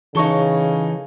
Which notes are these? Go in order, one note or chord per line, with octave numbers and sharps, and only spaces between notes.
C#3 E3 D#4 A4 C#6 G7